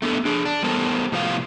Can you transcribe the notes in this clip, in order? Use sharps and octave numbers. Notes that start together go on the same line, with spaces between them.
A3 B3 D4 A4
D4 G#4
D4
G3 B3 A4 A#4 C5
A2 C3 F3 B3 C#5 F5